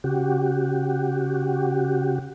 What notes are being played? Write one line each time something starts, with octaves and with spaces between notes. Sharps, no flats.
C#3 F#4 G4